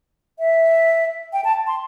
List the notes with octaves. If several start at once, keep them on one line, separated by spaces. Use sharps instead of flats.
E5
G5
A5
C6